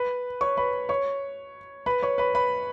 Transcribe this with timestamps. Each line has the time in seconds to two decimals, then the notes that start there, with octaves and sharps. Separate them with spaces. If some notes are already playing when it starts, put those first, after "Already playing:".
Already playing: B4 B5
0.41 C#5 C#6
0.57 B4 B5
0.89 C#5 C#6
1.86 B4 B5
2.02 C#5 C#6
2.18 B4 B5
2.35 B4 B5